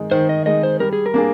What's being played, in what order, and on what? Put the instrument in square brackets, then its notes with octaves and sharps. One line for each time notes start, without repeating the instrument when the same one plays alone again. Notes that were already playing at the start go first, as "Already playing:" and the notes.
Already playing: [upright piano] D#3 G#3 D#4
[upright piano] D#3 [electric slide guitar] C5
[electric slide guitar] D#5
[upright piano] G#3 D#4 [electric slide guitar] D#5
[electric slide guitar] C5
[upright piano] G3 [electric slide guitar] A#4
[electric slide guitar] G#4
A#4
[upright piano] A#3 D4 G#4